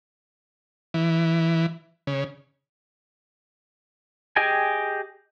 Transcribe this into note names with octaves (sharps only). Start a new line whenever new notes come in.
E3
C#3
G4 G#4 D#5 G5 G#5